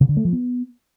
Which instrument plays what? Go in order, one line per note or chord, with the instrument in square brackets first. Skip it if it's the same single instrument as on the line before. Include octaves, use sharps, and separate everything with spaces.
[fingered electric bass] C#3
D3
A3
F3
B3